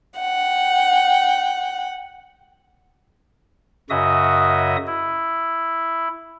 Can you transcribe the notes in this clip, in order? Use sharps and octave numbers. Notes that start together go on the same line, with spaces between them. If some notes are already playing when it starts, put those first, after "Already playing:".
F#5 G5
F#2 C#3 F#4 D#5 E5 D#6
E4